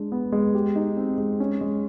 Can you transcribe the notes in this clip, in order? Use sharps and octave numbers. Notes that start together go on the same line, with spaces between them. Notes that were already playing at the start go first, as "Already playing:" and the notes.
Already playing: G#3 D4
B3
G#3
G4
D#4
C4
G#3
C#4
G#3